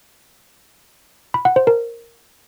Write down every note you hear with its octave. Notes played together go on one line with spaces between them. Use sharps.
B5
F#5
C5
A#4